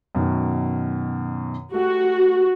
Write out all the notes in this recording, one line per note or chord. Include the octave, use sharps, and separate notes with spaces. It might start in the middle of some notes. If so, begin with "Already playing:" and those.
F#2 B2 D#3
A3 F#4 G4